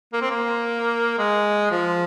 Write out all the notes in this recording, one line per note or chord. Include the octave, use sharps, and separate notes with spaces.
A#3
C4
A#3
G#3
F3